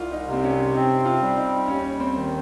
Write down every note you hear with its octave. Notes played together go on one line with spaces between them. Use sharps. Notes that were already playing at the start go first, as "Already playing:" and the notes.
Already playing: C2 F4
D#4
C3
C4
C#4
C4 D#4
F4
G3
D#4
D#2 C#4
C4
D#3